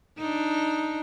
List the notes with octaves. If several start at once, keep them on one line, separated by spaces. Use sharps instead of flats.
D4 D#4